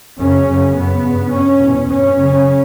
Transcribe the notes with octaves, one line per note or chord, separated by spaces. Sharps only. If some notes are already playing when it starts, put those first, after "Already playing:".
F#2 C#3 C#4
F#2 C#3
F#2 C#3 B3
G2
G2 C#4
E2 B2
G2 C#4
F#2 C#3